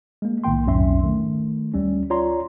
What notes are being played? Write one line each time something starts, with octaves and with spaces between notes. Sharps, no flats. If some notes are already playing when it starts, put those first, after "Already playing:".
G#3 A#3
B1 A2 D#3 A#3 G5 C6
B1 F2 G#2 C#4 E5 C6
D#3 A3
D2 G3 C#4
F4 C#5 D5 A#5 C6